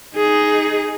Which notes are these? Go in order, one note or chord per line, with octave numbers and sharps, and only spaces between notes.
D#4 G#4